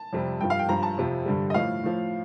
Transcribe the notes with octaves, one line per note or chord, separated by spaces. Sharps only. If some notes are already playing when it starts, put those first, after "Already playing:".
Already playing: A5
F2 C3 G3
G2 F3 G5
F5
G5
G2 F3 A#5
A5
F2 C3 F3
G2 D3 G3
D#5
A2 F3 F5
A2 F3